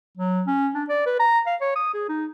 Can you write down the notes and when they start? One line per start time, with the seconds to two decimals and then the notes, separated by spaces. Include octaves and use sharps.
0.18 F#3
0.47 C#4
0.74 D4
0.89 D5
1.06 B4
1.19 A#5
1.46 F5
1.61 C#5
1.75 D#6
1.94 G#4
2.09 D#4